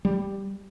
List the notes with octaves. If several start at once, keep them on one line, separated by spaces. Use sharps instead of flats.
G3